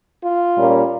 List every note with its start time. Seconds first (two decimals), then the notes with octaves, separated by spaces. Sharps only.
0.23 F4
0.57 A#2 G3 A#3 C#4